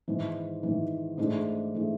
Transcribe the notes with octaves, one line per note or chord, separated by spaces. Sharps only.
G#1 G#2 E3
G#1 G#2 E3
G#2 E3 A3 D4 G#4
E3 A3 D4 G#4